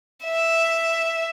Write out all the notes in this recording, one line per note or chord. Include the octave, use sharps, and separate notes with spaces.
E5